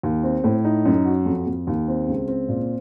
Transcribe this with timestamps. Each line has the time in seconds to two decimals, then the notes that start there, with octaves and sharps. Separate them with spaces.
0.03 D#2
0.23 C4
0.44 A2
0.65 D#4
0.86 F#2
1.05 F#4
1.26 F2
1.47 F2
1.67 D#2
1.88 C4
2.08 C#2
2.28 C4
2.49 A#2